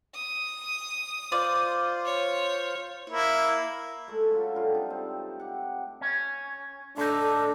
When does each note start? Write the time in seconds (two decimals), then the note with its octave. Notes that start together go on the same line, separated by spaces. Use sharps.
0.15 D#6
1.32 F4 C5 D5
2.05 C#5
3.10 A#3 E4
4.08 G#3 A3 A4
4.31 F#3 C#4 F4
4.54 D3 G3 F4
4.74 C3 D#4
4.90 C4
5.40 G4 F#5
6.01 C#4
6.97 A2 D4 D#4 A4